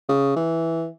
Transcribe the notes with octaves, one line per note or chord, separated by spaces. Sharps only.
C#3
E3